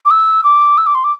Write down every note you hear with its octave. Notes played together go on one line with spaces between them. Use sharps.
D6
E6
D6
E6
D6
C6
D6